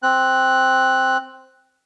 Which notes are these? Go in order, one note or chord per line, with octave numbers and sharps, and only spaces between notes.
C4 F#6